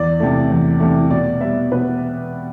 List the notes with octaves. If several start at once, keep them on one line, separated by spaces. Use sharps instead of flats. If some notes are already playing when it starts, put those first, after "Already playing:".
Already playing: E2 D5
C3 E3 A3
E2
C3 E3 A3
B2 D5
G3 B3 E5
B2 B4